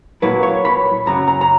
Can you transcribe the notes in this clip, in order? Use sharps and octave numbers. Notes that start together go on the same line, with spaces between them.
A#2 F#3 A#3 E4 B4
C#5
B5
F#2 C#3 F#3 A#5
A#5
A#5